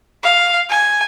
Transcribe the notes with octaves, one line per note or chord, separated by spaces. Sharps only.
F5
G#5